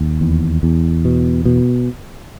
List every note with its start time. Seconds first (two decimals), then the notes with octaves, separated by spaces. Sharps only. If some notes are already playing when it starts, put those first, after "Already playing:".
Already playing: D#2
0.21 E2
0.63 E2
1.05 B2
1.45 B2